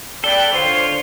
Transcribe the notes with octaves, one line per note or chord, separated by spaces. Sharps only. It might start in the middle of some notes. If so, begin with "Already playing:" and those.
A4 B4 D5 G5 G7
D3 F4 C5 C#5